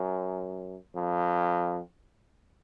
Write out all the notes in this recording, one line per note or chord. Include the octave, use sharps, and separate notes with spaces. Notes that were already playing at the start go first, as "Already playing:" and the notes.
Already playing: F#2
F2